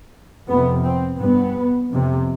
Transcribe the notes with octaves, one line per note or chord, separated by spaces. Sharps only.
F2 C3 B3
C4
G2 B3
F2 C3